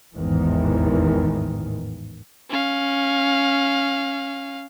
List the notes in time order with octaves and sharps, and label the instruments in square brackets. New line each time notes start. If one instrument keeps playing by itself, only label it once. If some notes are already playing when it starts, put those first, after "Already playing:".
[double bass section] A1 E2 G#2 D#3 E3
[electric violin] C#4 F5